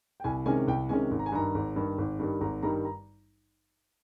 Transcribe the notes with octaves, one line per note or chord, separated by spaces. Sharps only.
G5
C2 G#5
C3 D#3 G#3 C#4 G#5
C2 G5
C3 D#3 G#3 C#4 G#5
G#1
A#5
G#5
G2 D#3 A#5
G#1
G2 D#3
G#1
G2 D#3 G3
G#1 A#5
G2 D#3 G3 A#5
A#5